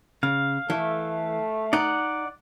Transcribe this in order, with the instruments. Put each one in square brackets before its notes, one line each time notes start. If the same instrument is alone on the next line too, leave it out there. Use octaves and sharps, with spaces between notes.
[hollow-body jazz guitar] C#3 [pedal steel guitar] F5
[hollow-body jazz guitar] E3 [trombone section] A3
[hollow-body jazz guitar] D#4 [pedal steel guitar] D5 F#5